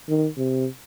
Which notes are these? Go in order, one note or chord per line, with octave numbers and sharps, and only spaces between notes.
D#3
C3